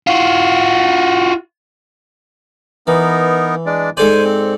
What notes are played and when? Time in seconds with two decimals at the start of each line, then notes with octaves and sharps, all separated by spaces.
0.07 F4 F#4
2.87 E3 B3 D#4 A#4
3.66 G#3 D4 D5
3.97 G#2 A4 C5 D5 G#5
4.25 C4